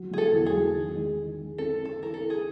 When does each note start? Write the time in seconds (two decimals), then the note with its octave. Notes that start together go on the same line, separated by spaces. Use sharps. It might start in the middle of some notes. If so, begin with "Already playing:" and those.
Already playing: F#3
0.11 F#3 G#4
0.18 A4
0.33 E2
0.46 G#4
0.53 F#3
0.74 D#3
0.96 G#3
1.16 D#3
1.37 G#3
1.58 C4 A4
1.79 C4
1.85 A4
2.00 E3 A#4
2.14 A4
2.20 E3
2.30 G#4